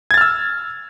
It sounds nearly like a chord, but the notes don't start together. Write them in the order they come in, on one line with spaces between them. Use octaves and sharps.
G#6 A6 F6 E6